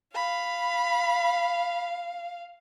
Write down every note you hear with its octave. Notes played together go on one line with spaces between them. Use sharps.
F5 B5